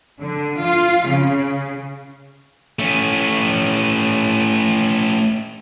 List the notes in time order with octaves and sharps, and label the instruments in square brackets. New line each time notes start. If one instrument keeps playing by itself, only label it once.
[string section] D3
F4
C#3
[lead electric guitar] A3 C#4